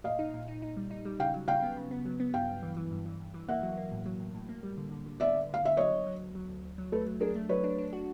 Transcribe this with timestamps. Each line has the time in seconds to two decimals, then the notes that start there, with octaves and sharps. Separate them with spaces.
0.04 A#2 D#5 F5
0.19 D#4
0.34 A#2
0.48 D#4
0.62 D#4
0.77 G3
0.91 D#4
1.05 G3
1.19 C#3 F5 G5
1.34 F#3
1.48 C#3 F5 G5
1.62 B3
1.77 C#3
1.91 B3
2.05 F#3
2.20 B3
2.34 G2 F5 G5
2.49 G2
2.63 E3
2.77 E3
2.91 G2
3.06 E3
3.20 G2
3.34 E3
3.48 A#3 E5 F#5
3.63 F#3
3.77 A#3
3.91 A2
4.06 F#3
4.20 A2
4.34 A2
4.49 A#3
4.63 G3
4.77 D3
4.91 D3
5.06 D3
5.20 B3 D5 E5
5.35 D3
5.49 D3 F5
5.63 D3 E5
5.77 F#3 C#5 D#5
5.92 D2
6.06 F#3
6.21 D2
6.35 F#3
6.49 D2
6.64 D2
6.78 F#3
6.92 A3 A4 B4
7.06 F#3
7.20 D4 G#4 A#4
7.35 A3
7.49 F#3 B4 C#5
7.64 D4
7.78 D4
7.93 F#4